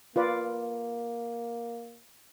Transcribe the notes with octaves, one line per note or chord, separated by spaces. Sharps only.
A#3 F4 B4 D5